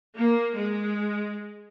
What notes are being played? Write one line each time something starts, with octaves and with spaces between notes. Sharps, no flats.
A#3
G#3